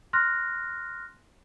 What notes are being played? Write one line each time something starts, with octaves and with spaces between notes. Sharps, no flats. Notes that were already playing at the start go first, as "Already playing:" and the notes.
C6 F6 F#6 A#6